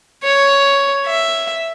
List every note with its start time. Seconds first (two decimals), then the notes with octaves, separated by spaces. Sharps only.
0.24 C#5
1.07 E5